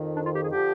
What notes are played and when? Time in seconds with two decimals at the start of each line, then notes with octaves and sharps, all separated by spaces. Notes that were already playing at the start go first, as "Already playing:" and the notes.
Already playing: F2 D#3
0.16 D4
0.25 F4
0.34 G4
0.43 G#4
0.52 D3 F3 G4